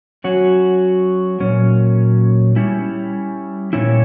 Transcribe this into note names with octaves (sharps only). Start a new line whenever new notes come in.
F#3 C#4 F#4
A#2 F#3 C#4
G3 C#4 E4
A#2 G3 C#4 E4